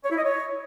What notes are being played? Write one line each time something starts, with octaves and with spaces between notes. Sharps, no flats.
C#5
E4
D#5
C#5